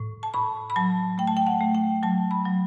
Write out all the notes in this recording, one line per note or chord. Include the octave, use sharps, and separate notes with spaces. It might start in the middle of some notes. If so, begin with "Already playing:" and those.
Already playing: A2
A5
A2 B5
B5
F#3 A5
A3 G5
A5
G5
F#5
A3
G5
F#3 A5
B5
F#3